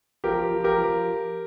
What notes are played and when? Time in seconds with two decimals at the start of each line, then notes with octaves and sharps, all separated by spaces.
0.24 F3 G4 A#4
0.51 F3
0.64 G4 A#4
0.78 F3